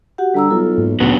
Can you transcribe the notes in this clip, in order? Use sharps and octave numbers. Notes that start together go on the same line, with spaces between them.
F#4 G4 F#5
D3 G3 A#5 E6
B1 F#3 F4 A4
G#2 A#3
D2 A#2 C#3 F#3 A3 B3 D4